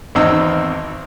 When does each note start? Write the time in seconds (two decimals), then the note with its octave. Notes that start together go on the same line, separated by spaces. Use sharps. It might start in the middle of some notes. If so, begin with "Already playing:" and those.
0.15 G#1 E2 C4 D#4 E6